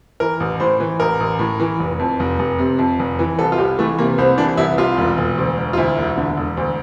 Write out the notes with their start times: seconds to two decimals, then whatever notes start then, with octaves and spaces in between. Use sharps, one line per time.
0.20 E3 A#4
0.40 A1
0.60 A2 C5
0.80 E3
1.00 A1 A#4
1.20 A1
1.39 A2
1.60 E3
1.80 F1
1.99 F2
2.20 F1
2.39 F1
2.59 C3
2.79 F2
2.99 F1
3.19 E3
3.38 C2 A4
3.52 F4
3.58 C2 G4
3.79 E3 A3
3.99 C3 A#3
4.18 C2 C4
4.38 E3 D4
4.57 C2 E4
4.78 C2 F4
4.98 E1
5.18 E1
5.38 D2
5.57 E1
5.73 F4
5.77 D2 E4
5.98 E1
6.17 D3
6.37 E1
6.57 D2